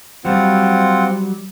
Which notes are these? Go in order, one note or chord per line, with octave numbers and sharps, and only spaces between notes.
F#3 G3 C4 F4 F#5